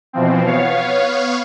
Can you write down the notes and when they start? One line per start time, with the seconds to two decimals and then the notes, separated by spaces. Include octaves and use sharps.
0.13 B2 E3 F3 C4
0.46 B3 C#5 F5